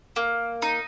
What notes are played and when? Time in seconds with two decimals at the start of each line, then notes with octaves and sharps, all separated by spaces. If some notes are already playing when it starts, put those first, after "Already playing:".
0.16 A#3
0.62 D#4